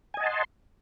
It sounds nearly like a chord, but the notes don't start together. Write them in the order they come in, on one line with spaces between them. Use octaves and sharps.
G#5 D#5 F#5 A5 C6